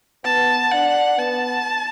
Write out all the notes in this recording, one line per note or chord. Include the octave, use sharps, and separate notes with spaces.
B3 A5
D4 F#5
B3 A5